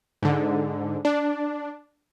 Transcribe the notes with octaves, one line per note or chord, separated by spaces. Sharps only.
G#2 D3
D4